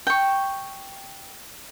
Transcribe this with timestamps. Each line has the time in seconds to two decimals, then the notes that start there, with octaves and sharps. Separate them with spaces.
0.07 G5 C#6